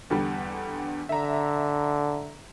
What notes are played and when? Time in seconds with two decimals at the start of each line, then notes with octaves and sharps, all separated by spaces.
0.10 E2 D3 G3
1.09 D3 E5 A#5